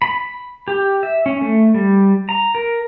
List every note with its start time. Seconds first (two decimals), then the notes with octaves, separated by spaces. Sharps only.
0.02 B5
0.68 G4
1.03 E5
1.26 C#4
1.41 A3
1.74 G3
2.29 A#5
2.55 A#4